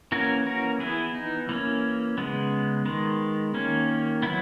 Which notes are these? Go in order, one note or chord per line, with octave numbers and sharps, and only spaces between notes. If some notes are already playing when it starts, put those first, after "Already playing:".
E3 A#3 C#4 F#4 A#4
F#4 A#4
E3 B3 E4 G#4
D#4
E3 A#3 C#4
C#3 G#3 B3
D#3 G#3 B3
D#3 A#3 C#4
F#3 B3 E4